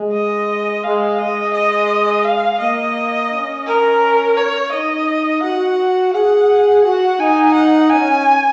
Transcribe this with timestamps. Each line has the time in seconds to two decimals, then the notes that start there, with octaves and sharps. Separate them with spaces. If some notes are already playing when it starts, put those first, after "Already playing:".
Already playing: G#3
0.14 D#5
0.84 G#3 F5
1.19 G#3 D#5
1.54 D#5
2.25 F5
2.60 A#3 D#5
3.31 C#4
3.66 A#4
4.37 C#5
4.72 D#4 D#5
5.43 F#4 F#5
6.13 G#4 F#5
6.84 F#4 F#5
7.19 D#4 G#5
7.54 F#5
7.90 C#4 G#5